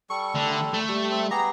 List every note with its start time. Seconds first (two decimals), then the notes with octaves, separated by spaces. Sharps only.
0.10 G3 A4 C#6
0.35 D3 A3
0.74 A3
0.89 G3
1.10 C4
1.31 B3 G4 G#4 A#5